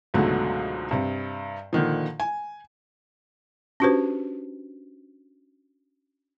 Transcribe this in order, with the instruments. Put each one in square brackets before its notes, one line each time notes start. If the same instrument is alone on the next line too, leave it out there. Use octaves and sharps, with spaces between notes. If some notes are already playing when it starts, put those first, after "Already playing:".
[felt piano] C#2 G#2 B2 D3 F#3 A3
G2 C3
A#2 D3 D#3 F3
G#5
[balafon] C#4 D4 F#4 G4 B4 C5